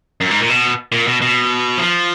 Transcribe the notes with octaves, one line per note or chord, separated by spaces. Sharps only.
F#2
G#2
A#2
B2
A#2
B2
B2
F3